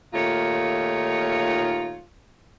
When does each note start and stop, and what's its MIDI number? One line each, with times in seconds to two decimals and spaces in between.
0.14 2.02 39
0.14 2.02 46
0.14 2.02 57
0.14 2.02 63
0.14 2.02 65
0.14 2.02 73